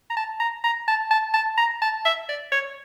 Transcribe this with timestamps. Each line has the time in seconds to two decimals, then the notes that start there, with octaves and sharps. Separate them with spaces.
0.10 A#5
0.17 A5
0.40 A#5
0.64 A#5
0.88 A5
1.11 A5
1.34 A5
1.58 A#5
1.82 A5
2.05 E5
2.29 D5
2.52 C#5